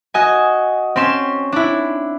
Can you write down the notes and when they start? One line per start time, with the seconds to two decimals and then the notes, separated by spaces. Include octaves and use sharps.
0.14 F#4 D#5 G#5
0.96 C4 C#4 C6 E7
1.52 D4 E4